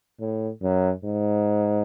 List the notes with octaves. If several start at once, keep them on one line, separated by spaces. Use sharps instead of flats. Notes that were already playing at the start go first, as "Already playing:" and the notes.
A2
F#2
G#2